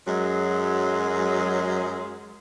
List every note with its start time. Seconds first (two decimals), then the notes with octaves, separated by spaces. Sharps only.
0.08 F#2 F#3 G#3